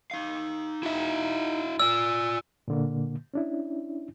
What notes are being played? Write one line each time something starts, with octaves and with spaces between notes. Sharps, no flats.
D#4 F5
E4 F#4 E5
F4 D5 E6
A#2 D3 A#3
C#4 D4 E4